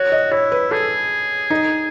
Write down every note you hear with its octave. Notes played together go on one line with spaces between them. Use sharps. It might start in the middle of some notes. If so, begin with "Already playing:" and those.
Already playing: F#4 C#5
D#5
E4 C#5
B4
G#4 A4
D#4